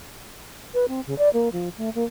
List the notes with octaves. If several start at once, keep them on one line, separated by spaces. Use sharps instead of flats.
B4
C4
C#3
D5
A#3
F3
A3
A#3